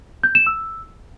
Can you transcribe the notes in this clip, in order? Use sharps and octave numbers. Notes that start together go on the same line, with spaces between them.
G6
E7
E6